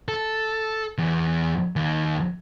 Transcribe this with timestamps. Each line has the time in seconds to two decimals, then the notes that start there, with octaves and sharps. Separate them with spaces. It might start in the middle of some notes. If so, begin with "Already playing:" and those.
0.08 A4
0.98 E2
1.76 D#2 D#3